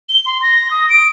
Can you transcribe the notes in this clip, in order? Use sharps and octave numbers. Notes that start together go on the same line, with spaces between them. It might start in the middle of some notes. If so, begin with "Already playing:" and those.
G7
C6
A#6
D#6
D7